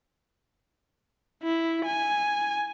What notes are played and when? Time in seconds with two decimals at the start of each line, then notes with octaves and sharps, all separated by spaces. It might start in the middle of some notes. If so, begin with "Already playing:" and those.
1.43 E4
1.85 G#5